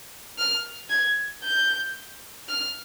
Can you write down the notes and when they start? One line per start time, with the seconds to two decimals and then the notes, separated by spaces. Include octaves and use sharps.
0.38 F6
0.90 G#6
1.43 G6
2.48 F6